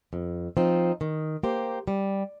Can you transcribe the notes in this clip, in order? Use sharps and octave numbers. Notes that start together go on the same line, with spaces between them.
F2
F3 C4 D#4
D#3
A#3 G4 C5
G3